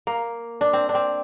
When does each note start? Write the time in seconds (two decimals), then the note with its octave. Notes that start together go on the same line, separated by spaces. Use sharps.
0.07 A#3
0.61 D4
0.73 C4
0.89 D4
0.95 C4